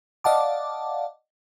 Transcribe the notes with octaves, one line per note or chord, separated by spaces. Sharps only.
D5 D#5 F5 F#5 A5 D6